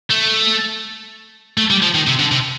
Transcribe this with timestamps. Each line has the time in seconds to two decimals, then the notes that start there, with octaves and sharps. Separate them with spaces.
0.11 A3
1.58 A3
1.70 G3
1.83 F3
1.94 D#3
2.07 C3
2.19 D3
2.31 C3